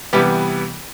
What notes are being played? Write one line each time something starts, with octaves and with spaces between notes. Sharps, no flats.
C3 E3 G3 B3 G4